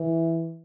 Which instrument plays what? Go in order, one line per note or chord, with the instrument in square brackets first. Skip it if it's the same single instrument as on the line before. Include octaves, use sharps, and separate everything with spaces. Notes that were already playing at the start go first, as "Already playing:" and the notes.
Already playing: [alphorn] E3